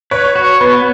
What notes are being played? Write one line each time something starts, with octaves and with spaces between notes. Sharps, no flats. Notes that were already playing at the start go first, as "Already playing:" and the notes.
B4 C#5
F#4
B3 B4